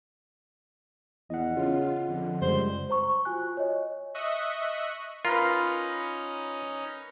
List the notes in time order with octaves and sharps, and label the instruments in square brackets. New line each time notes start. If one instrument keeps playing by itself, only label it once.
[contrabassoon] E2 [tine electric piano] D#5 F#5
[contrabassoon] C#3 [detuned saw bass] F4
[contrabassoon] F2 [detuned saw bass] D3
[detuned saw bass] F#2 [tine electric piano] C#3 G3 G#3 [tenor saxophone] C5
[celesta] C5 A#5 C#6
F4 F#4 G#5 F#6
C#5 D#5
[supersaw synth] D#5 E5 C#6 D#6 F#6
[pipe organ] C#4 D#4 [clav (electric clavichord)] F4 [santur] A#4 B4